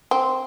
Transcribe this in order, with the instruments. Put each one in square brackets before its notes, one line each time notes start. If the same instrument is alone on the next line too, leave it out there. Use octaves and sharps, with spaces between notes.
[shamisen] C4